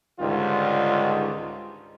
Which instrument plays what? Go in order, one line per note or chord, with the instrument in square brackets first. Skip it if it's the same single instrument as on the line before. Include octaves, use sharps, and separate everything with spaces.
[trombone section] C#2 G#2 D3 D#3 G3 F4